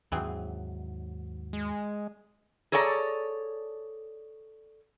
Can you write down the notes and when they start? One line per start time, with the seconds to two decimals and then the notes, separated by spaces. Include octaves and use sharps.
0.12 D#2 G#2 E3 F#3 C4 G#4
1.53 G#3
2.72 G#4 A4 C#5 D5 G5 A#5